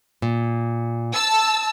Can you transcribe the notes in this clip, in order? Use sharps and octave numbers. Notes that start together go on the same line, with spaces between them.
A#2
A5 E6